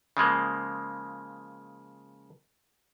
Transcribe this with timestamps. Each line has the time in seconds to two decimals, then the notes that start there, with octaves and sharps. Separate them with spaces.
0.17 C#3 F3 G#3 A#3